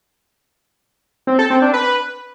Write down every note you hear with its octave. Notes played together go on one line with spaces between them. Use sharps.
C4
A4
C4
D4
B4